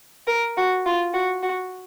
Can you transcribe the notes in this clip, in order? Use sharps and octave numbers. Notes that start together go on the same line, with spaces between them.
A#4
F#4
F4
F#4
F#4